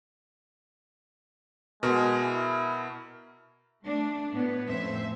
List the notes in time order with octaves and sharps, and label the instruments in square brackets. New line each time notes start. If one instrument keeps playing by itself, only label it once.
[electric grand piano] B2 A#4 [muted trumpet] G#3
[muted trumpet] E4
[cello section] A3 D4
A2 B3 B4 C#5
F2 A2 C#4 C5 E5